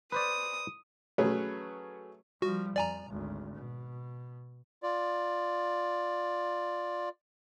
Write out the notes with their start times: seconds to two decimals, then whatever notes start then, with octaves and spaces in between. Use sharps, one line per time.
0.12 B4 C5 D5 D#6
1.18 F#3 A3 C#4 G#4 B4 C#5
2.42 F3 G3 F#4
2.76 F2 D5 G#5 A#5
3.07 G#1 D2
3.55 B2
4.83 F4 D5